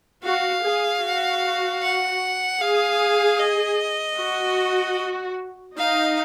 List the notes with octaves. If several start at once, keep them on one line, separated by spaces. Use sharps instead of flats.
F#4 F5
G#4
F#4
F#5
G#4 F5
D#5
F#4
D#4 F5